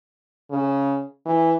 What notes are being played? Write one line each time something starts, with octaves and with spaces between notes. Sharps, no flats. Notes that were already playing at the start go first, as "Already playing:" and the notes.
C#3
E3